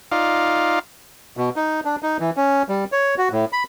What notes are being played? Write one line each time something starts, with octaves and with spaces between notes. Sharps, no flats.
D#4 F4 D5 F5
B2
D#4
D4
D#4
E3
C#4
G3
C#5
F#4
A2
B5